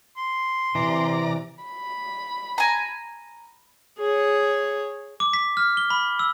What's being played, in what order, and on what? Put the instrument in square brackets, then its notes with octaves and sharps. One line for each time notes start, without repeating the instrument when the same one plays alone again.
[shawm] C6
[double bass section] C3 [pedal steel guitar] E3 [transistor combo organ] D5 A#5
[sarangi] B5
[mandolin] G#5 A#5
[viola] G#4 C#5
[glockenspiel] D6
B6
F6
G7
B5
E6